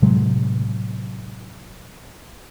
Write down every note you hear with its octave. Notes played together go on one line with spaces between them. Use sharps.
A2 C3 F#3 G#3